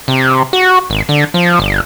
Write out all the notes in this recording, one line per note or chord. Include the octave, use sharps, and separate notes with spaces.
C3
F#4
G#1
D3
F3
G1